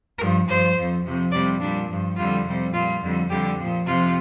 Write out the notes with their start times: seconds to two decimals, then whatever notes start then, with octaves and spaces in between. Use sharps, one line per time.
0.19 G2 F3 A#4
0.47 G2 F3 C5
0.76 F2 F3
1.04 F2 C3 F3
1.32 F2 C3 G3 D5
1.60 A#2 G3 D4
1.89 G2 F3
2.16 F2 D3 G3 F4
2.45 F2 C3 G3
2.73 A#2 G3 F4
3.01 F2 D3 G3
3.29 F2 D3 G3 G4
3.57 F3
3.63 A#2
3.86 F2 C3 F3 F4